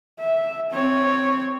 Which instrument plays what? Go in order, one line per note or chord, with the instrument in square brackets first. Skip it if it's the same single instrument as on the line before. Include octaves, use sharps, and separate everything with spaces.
[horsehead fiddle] E5
C4 C#5